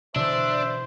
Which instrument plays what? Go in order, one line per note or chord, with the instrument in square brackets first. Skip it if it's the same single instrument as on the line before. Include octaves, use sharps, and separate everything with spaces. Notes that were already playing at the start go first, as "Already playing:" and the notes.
[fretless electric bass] B2 D3 E3 [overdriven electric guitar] D4 [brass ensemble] C5 [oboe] E5